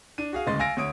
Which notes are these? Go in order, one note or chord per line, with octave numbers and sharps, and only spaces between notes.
D4 D#7
F#4 G#4 F5
D1 C#3 G#3 D#5 C6 A6
F5 G#5 E6 A#6 D7
D2 C#5 D#6 D7